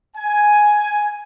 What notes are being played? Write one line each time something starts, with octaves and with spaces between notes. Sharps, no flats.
G#5